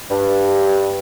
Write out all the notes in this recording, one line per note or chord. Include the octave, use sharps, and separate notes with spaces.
G2